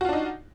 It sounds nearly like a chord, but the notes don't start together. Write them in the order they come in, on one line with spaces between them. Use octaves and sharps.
F#4 F4 D4 D#4